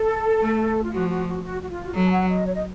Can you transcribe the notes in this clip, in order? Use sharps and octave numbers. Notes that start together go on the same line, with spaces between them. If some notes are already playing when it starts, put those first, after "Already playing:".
Already playing: A4
A3
F4
F3 F#4
F#4
F#4
F#4
F#4
F4
F#4
F#3 A4
A5
F#5
D#5
C#5
D#5